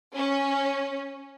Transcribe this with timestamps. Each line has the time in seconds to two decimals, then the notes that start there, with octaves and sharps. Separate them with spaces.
0.15 C#4